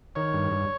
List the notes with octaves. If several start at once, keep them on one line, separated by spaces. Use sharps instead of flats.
D#3 C#5
G2
G2